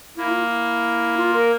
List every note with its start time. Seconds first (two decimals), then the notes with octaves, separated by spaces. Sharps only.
0.17 A#3 E4
0.30 F4
0.42 E4
1.17 F4
1.34 A#4